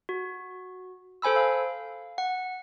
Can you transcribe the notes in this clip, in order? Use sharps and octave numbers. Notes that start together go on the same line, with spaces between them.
F#4
A4 C5 G#5 B5 E6
F5
F#5